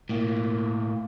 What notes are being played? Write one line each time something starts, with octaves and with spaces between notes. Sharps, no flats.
A2 A#3